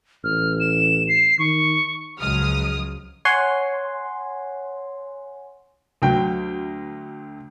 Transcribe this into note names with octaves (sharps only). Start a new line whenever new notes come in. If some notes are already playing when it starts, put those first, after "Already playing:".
A1 F6
E7
C7
D#3 C#6
C#2 F3 F#3 G#3 D#6 F6
C#5 F#5 G#5 C6
D2 F#3 G5